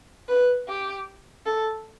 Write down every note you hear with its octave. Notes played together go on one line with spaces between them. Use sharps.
B4
G4
A4